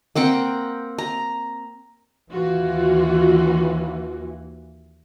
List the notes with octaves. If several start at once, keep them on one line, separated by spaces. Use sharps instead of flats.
A#3 C4 F#5 G5
A#5
D#2 E3 F4 F#4